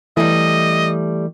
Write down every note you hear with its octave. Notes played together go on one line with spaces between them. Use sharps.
E3 G3 A3 D#5